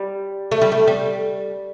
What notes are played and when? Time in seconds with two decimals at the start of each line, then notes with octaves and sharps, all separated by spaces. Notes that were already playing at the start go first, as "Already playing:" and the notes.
Already playing: G3
0.51 A3
0.62 G3
0.72 A3
0.87 G3